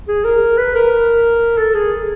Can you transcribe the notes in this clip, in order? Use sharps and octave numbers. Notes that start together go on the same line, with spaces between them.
G#4
A#4
B4
A#4
A4
G#4